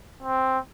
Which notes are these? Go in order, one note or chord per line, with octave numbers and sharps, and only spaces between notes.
C4